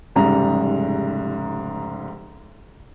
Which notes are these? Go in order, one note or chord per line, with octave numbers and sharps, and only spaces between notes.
F1 G#2 C#3 G3 A#5